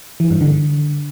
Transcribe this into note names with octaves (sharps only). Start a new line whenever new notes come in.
E3
G2
D3